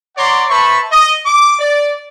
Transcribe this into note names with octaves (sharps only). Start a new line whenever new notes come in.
C#5 D5 F#5 A#5 C6 D6
B4 C5 E5 A5 B5 C#6
D#5
D6
D5